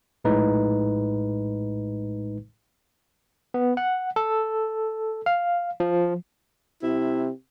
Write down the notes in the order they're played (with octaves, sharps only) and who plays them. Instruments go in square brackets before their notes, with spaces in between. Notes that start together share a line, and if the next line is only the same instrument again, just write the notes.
[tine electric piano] A#1 A2 G#3 D#4 B4
B3
F#5
A4
F5
F3
[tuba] C3 [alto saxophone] E4